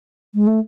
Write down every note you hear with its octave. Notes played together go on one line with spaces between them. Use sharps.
G#3
A3